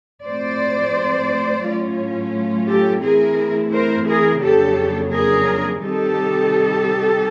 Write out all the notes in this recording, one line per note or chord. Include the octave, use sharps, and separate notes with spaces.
A2 F3 G#3 C4 C5 D5
A2 F#3 A3 C#4 F4
G4 A4
E3 A3 C4 E4 G#4 A#4
A#4 C5
G#4 A#4
F2 C#3 F#3 A#3 D4 G4 A4
G#4 A#4
C3 D#3 G3 C4 D#4 G4 A4